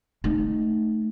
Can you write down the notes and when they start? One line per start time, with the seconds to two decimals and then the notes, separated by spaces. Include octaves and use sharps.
0.24 A3 D#4